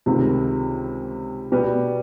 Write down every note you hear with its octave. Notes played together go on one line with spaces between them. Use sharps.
C#2 C3 D#3
B2 G3 B3